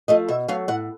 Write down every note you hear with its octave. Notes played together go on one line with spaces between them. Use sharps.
F3 A3 D#5
B2 E5
F#3 A3 F5
A2 F#5